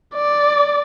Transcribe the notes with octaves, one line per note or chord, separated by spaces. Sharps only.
D5